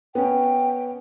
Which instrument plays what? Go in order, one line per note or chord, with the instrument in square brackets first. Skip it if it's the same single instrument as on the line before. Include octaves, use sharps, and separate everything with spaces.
[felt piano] B3 C#4 [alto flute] G5